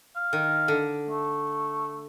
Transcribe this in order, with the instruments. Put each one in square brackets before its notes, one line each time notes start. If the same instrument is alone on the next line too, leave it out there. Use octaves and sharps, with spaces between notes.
[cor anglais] F5
[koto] D#3
D3
[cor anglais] A3